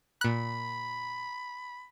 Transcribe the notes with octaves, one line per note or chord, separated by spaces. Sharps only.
A#2 B5 F#6